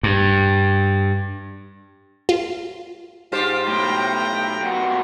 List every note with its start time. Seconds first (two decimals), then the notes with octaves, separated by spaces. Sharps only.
0.03 G2
2.29 F4
3.32 G#2 F4 G4 C5
3.68 B1 A2 G5 A#5
4.62 A#2 F#4